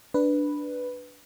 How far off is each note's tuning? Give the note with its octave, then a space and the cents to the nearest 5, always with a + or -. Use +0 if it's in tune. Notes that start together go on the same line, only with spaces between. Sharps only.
D4 +0 B4 +0